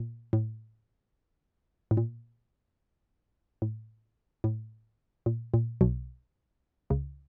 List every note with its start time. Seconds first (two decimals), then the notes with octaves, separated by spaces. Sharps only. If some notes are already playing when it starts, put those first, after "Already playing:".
Already playing: A#2
0.33 A2
1.91 A2
1.97 A#2
3.62 A2
4.44 A2
5.26 A#2
5.54 A#2
5.81 B1 B2
6.90 C#2 C#3